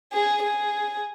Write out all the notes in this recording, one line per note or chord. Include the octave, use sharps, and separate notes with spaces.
G#4
G#4